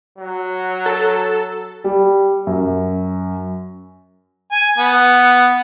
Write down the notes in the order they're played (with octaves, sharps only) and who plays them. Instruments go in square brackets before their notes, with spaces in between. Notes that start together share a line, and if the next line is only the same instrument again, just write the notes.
[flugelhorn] F#3
[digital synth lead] A4
[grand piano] G3
F#2
[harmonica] G#5
B3